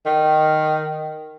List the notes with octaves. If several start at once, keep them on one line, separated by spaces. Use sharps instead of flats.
D#3